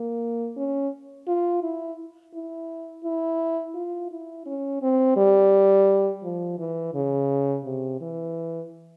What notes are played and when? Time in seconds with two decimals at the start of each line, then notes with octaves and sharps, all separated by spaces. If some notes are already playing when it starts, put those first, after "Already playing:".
Already playing: A#3
0.57 C#4
1.27 F4
1.62 E4
2.34 E4
3.04 E4
3.75 F4
4.11 E4
4.46 C#4
4.82 C4
5.17 G3
6.24 F3
6.59 E3
6.94 C#3
7.65 C3
8.01 E3